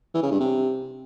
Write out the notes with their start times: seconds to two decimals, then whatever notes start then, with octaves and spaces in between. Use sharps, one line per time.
0.14 E3
0.23 C#3
0.32 G2
0.40 C3